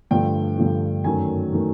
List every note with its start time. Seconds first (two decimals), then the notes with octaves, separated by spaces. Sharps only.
0.11 G2 D3 F3 A3 G5
0.58 G2 D3 F3 A3
1.04 F#2 D#3 F#3 A3 G#5
1.53 D#3 F#3 A3